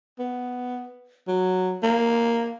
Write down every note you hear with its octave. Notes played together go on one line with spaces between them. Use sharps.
B3
F#3
A#3